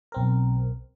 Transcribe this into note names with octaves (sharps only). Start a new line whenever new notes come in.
B1 C4 A#4